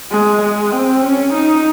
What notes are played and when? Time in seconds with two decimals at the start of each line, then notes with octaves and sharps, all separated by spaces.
0.11 G#3
0.42 G#3
0.72 C4
1.02 C#4
1.33 D#4